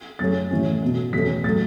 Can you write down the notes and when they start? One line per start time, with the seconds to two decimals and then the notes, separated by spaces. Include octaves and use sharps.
0.19 F#2 C#3 A3 C#4 A6
0.51 A2 E3 A3 C#4
0.83 B2 B3
1.13 E2 B2 A3 C#4 B6
1.44 A2 F#3 A3 A6